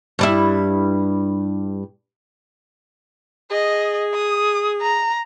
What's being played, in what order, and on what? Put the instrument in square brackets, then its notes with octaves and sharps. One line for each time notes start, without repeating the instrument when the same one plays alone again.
[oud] G2 G3 E4
[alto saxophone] G#4 [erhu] D#5
[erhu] D#6
A#5